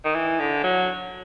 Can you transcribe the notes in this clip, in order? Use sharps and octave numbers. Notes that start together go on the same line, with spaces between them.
D#3
E3
D3
F#3